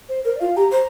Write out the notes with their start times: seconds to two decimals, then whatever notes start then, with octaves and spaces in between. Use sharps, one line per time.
0.09 C5
0.25 A#4 C5
0.36 D5
0.40 F4 F5
0.56 G4 A#5
0.72 C5 A#5